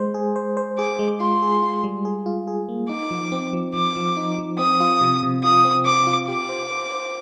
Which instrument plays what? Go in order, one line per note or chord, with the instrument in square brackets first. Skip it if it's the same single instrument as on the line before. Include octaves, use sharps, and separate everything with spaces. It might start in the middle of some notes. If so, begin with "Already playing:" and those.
Already playing: [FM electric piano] G#3 C5
G#4
C5
C5
[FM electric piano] G#4 [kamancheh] D6
[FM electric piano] G#3
[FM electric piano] F4 [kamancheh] C6
[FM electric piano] G#4
F4
G3
G#4
F4
G#4
A#3
[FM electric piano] D#4 [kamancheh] D6
[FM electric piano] F3
C4
F3
[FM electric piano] F3 [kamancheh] D6
[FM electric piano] F3
D#4
F3
[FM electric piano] C4 [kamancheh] D#6
[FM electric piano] F4
C3
C3
[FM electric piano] F4 [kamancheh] D#6
[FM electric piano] C4
[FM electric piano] C4 [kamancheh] D6
[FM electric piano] F4
[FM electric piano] G4 [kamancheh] D6
[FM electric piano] C5
C5
C5